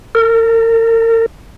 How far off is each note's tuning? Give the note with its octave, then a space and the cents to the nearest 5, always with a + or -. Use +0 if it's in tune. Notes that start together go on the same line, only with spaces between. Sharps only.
A#4 -40